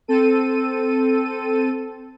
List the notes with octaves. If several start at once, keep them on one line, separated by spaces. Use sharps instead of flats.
C4 A4 D#7